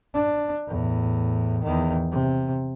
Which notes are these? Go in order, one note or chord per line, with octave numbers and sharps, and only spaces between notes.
D4
E2 A2
E2 D#3
C3